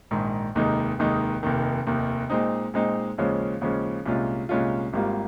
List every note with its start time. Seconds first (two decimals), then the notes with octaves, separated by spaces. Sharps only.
0.11 A#1 G#2 D#3
0.55 F1 D#2 D#3 G#3 D#4
0.99 F1 D#2 D#3 G#3 D#4
1.43 F1 D#2 D#3
1.87 F1 D#2 D#3
2.30 A#2 G#3 C4 D#4
2.74 A#2 G#3 C4 D#4
3.18 D#2 C#3 F3 G#3 C#4
3.61 D#2 C#3 F3 G#3 C#4
4.06 C2 A#2 G#3 C#4 F4
4.49 C2 A#2 G#3 C#4 F4
4.93 G#1 G#2 G3 A#3 F4